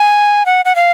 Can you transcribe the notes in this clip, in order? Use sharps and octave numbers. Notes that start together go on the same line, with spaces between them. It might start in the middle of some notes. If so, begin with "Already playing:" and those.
Already playing: G#5
F#5
F#5
F5